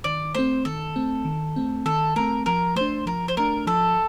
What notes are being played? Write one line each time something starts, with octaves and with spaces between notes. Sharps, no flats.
D#3 D5
A3 C4 C5
D#3 A4
A3 C4
D#3
A3 C4
D#3 A4
A3 C4 A#4
F3 A#4
A3 D4 C5
F3 A#4
C5
A3 D4 A#4
F3 A4